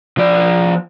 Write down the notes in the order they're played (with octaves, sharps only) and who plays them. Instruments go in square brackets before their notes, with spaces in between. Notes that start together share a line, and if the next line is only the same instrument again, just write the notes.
[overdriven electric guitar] F3 D5